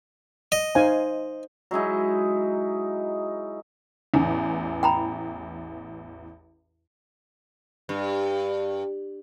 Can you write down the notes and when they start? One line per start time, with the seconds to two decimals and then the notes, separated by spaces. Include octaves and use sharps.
0.52 D#5
0.75 D#4 C5 F5 G#5
1.71 F#3 G#3 D#4 E4
4.14 A1 E2
4.83 G5 A#5 B5
7.89 G2